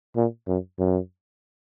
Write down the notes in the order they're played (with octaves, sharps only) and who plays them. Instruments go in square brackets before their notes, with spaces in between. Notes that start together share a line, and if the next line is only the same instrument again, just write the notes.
[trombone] A#2
F#2
F#2